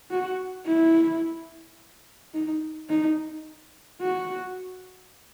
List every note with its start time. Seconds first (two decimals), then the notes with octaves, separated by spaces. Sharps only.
0.11 F#4
0.66 E4
2.34 D#4
2.89 D#4
4.02 F#4